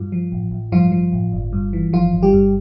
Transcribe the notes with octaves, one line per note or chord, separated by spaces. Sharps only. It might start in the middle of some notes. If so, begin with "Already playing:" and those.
Already playing: G2 F4
F3
A1
A1
G2 F3 F4
F3
A1
G1
G2
E3
G1 F3 F4
G1
G3 G4
G2